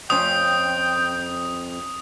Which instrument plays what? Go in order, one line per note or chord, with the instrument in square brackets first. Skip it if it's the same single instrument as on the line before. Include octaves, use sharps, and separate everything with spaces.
[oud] F2 C#4 [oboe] G5 [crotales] D#6